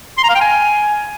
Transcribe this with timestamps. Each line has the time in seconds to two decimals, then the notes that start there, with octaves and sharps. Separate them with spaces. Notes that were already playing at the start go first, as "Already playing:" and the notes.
0.18 C6
0.24 A#5
0.29 F5
0.35 G5
0.41 G#5